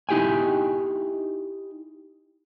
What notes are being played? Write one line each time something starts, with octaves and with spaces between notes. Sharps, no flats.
D#4 E4 G4 G5 G#5